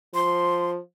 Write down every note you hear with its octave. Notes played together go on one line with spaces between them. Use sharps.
F3 C6